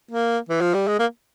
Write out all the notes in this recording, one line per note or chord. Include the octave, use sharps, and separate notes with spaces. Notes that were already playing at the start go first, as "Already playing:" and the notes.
A#3
E3
F3
G3
G#3
A#3